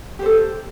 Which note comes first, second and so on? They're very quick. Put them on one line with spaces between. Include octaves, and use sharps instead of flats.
G4 C5 A4